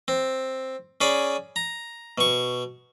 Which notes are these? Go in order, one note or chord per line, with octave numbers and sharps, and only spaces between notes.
C4
C#4 G#4 D5 B5
A#5
B2 C#6